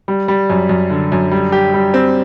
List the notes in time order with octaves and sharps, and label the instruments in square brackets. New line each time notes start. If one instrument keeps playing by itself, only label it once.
[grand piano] G3
G3
F#2
F#2
D3
F#2
G3
G4
G3
C4